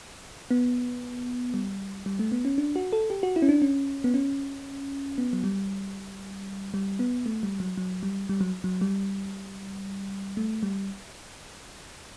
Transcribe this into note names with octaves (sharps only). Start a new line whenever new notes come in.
B3
G3
G3
A3
B3
C#4
D4
F#4
A4
G4
F#4
E4
C#4
D4
C#4
B3
C#4
B3
F#3
G3
G3
B3
A3
G3
F#3
F#3
G3
G3
F#3
F#3
G3
A3
G3